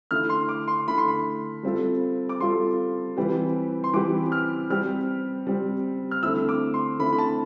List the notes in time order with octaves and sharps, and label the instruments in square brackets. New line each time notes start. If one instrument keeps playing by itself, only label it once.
[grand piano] D3 A3 E4 [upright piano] F6
[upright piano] C6
D6
C6
[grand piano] D3 A3 E4 [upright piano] B5
[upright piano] C6
B5
[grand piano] G3 C4 F4 A4
[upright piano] D6
[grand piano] G3 C4 F4 A4 [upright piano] C6
[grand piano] E3 G3 C4 G4 B4
[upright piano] C6
[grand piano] E3 G3 C4 G4 B4 [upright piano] D6
[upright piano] F6
[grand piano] G3 C4 G4 [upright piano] F6
[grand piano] G3 C4 G4
[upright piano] F6
[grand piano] D3 A3 C4 E4 [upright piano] E6
[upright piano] D6
C6
[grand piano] D3 A3 C4 E4 [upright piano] B5
[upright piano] B5
A5